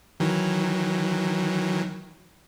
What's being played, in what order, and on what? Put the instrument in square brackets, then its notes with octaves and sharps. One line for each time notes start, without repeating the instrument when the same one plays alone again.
[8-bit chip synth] D#3 E3 F#3